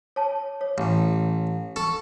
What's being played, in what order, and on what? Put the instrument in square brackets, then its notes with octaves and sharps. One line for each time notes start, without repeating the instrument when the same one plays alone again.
[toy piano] C#5 A5
C#5
[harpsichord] A1
[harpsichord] A4 [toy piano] C#6